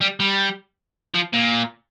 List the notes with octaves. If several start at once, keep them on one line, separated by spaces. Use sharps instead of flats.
G3
G3
F3
A#2